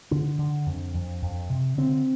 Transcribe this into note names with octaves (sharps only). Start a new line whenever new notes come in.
D3 D4
D3
F2
F2
F2
C3
D3 C4